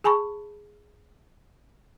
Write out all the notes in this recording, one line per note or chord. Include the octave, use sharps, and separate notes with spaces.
G#4 G#5 A5 B5 C#6